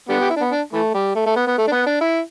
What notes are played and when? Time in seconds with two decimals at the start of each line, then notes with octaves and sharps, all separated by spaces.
0.09 D3 G3 B3
0.20 G4
0.30 E4
0.36 D4
0.41 B3
0.52 D4
0.73 E3 A3
0.94 G3
1.15 A3
1.26 A3
1.36 B3
1.47 B3
1.58 A3
1.68 D4
1.72 B3
1.86 D4
2.01 E4